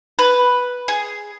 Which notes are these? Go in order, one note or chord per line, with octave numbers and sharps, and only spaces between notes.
B4
G#4